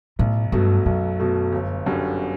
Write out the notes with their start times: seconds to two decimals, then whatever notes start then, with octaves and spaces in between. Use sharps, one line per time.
0.19 B1 A2
0.52 G2 B2 F#3 A3
0.86 B1 F#2
1.19 B2 F#3 A3
1.53 G1
1.86 F#2 D3 G3